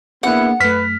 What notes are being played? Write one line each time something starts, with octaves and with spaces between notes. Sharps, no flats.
A#3 B3 D4 E4 G#4 F#5
F#2 A3 B4 F6 B6